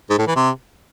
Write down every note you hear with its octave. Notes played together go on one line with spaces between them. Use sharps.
G#2
A2
E3
C3